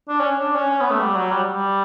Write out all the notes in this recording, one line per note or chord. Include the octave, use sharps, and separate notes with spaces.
D4
C#4
D4
C#4
C#4
B3
A3
G3
F#3
G3
G3